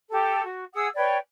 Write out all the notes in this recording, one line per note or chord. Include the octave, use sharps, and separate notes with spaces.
G4 A4 A5
F#4
G#4 F#5 D#6 E6
B4 C#5 D5 G5